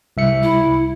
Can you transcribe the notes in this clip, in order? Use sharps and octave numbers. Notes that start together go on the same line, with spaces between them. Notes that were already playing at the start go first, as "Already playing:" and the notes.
C2 E5 C#7
E4